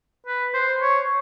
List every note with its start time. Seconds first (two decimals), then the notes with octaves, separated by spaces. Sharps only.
0.27 B4
0.54 C5
0.82 C#5